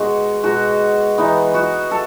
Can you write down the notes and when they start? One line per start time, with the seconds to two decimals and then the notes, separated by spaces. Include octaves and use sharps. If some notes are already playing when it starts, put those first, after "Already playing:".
Already playing: B2 G#3 D#4 F#4
0.44 B2 G#3 D#4 F#4
1.18 E3 B3 D#4
1.54 F#4
1.91 A4